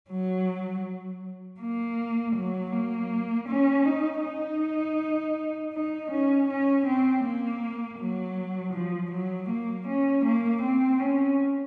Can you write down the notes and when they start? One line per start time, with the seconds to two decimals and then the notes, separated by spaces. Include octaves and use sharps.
0.10 F#3
1.61 A#3
2.36 F#3
2.73 A#3
3.49 C#4
3.86 D#4
4.24 D#4
5.74 D#4
6.11 C#4
6.49 C#4
6.86 C4
7.24 A#3
7.99 F#3
8.74 F3
9.12 F#3
9.50 A#3
9.87 C#4
10.25 A#3
10.62 C4
11.00 C#4